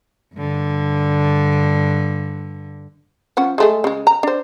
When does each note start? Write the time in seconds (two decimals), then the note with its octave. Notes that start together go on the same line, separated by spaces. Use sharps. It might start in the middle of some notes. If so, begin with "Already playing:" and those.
0.35 G2 D3
3.37 F3 C#4 F#5
3.58 G#3 A3 G#4
3.84 C#3 G#3
4.07 A#5
4.23 D4 C5